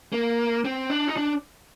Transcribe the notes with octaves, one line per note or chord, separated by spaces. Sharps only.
A#3
C4
D4
D#4
D4